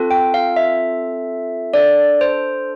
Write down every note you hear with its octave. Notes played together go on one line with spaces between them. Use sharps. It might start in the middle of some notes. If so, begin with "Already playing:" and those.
Already playing: C4 F4 A4
G5
F5
E5
D4 A4 D5
C5